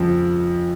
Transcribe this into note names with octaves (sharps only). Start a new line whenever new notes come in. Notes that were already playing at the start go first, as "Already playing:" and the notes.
Already playing: F2 C#3 F3